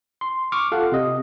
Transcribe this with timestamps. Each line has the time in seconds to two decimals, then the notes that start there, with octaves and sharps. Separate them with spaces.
0.21 C6
0.52 C#6 D6 F6
0.72 F4 A4 F5 F#5
0.92 C3 D#5